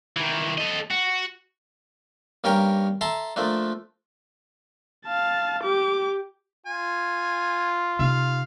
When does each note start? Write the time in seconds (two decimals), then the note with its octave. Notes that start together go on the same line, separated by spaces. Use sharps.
0.17 D#3 E3
0.58 A4 D#5
0.91 F#4
2.44 G2 A#3 C#4 A#4 C#5 G5
3.01 A4 E5 A5 A#5 C6
3.36 F3 A3 A#3 D4
5.06 F5 A5
5.63 G4 D6
6.66 F4 G#5
7.99 C3 D#4 F5